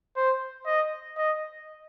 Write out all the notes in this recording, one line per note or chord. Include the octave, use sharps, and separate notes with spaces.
C5
D#5
D#5